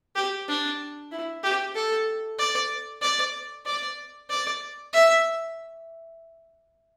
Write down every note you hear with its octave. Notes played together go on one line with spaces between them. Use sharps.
G4
D4
E4
G4
A4
D5
D5
D5
D5
E5